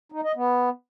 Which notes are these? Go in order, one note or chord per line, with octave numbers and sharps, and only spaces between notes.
D#4
D#5
B3